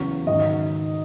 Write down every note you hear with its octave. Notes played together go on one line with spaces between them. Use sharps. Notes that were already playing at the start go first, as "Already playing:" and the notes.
Already playing: E2 C#3 F#3 C#6
G#2 D#3 F#3 D#5